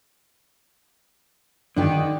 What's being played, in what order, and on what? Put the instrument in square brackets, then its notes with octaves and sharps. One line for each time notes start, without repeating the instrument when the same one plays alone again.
[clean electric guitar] D3 D#3 [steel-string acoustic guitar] D4 D#4 G4